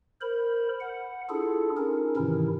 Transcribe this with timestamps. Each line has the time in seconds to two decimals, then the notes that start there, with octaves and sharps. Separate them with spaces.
0.21 A#4 C5 B5
0.81 F#5
1.29 D4 E4 F4 G#4 A4
1.77 C#4 D#4 A#4
2.16 G#2 C3 D#3 E3 E4